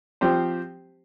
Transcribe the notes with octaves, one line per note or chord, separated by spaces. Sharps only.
F3 C4 G4 C5